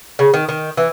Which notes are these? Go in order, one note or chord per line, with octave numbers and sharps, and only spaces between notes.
C#3
D#3
D#3
E3